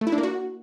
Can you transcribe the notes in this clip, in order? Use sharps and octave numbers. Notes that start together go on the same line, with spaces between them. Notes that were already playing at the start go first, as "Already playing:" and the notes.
A3
E4
D4
A#3
F#4